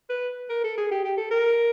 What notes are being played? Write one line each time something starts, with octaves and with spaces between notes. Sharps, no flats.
B4
A#4
A4
G#4
G4
G4
A4
A#4